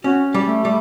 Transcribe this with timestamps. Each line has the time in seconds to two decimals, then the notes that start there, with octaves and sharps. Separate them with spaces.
0.04 C#4 F#4
0.34 G3
0.45 A3
0.65 G3